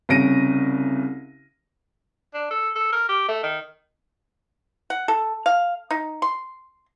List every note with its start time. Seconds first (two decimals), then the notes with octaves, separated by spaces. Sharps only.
0.09 C2 C#3 C#4 A#6 D7 D#7
2.34 D4
2.51 A4
2.75 A4
2.92 A#4
3.09 G4
3.29 A3
3.43 D#3
4.90 F#5
5.08 A4
5.46 F5
5.91 D#4
6.22 C6